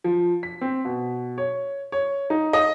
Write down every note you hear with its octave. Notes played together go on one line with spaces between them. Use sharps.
F3
B6
C4
B2
C#5
C#5
D#4
D#5